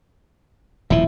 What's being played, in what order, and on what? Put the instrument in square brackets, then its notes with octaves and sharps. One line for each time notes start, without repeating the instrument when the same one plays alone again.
[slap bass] D#1 A2 F3 [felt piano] E4 E5